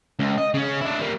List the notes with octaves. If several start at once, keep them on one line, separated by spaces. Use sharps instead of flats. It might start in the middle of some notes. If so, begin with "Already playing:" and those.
C#2
D#5
C#3 C#4
D4 E4
G3 A#3